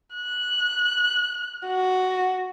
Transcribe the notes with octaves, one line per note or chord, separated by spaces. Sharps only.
F#6
F#4